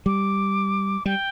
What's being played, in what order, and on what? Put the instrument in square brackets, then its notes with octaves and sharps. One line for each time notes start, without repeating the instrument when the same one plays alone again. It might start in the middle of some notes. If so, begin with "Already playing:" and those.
[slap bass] G3 [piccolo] D6
[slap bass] G3 [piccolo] G5